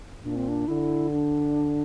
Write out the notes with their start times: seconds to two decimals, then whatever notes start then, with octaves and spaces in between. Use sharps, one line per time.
0.24 A#2 D4
0.36 C4
0.48 D4
0.68 D3 E4
1.12 D4